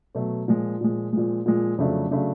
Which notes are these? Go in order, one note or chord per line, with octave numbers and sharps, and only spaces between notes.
B2 F#3 A3
A#2 F3 G#3
A#2 F3 G#3
A#2 F3 G#3
A#2 F3 G#3
F2 C#3 F#3 A3 D4
C#3 F#3 A3 D4